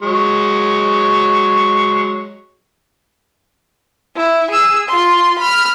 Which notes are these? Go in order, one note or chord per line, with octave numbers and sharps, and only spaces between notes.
F#3 G#3 C#6
E4
G#4 E6
F4 C6
B5 F6